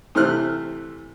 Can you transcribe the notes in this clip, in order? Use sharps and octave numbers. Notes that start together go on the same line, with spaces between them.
C3 E3 A3 C5 F6 F#6